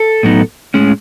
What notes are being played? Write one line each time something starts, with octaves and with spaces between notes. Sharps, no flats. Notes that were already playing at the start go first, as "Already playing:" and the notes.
Already playing: A4
A2 F#3 B3 D#4
A2 G#3 C#4